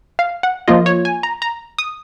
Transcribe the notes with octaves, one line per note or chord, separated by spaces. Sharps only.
F5
F#5
F3 A#3 F4 D#5
C#5
G#5
A#5
A#5
D#6